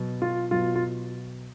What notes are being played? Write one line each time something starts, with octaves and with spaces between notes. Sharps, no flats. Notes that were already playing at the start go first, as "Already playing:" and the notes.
Already playing: B2 F#3
F4
B2 F#3 F4
F4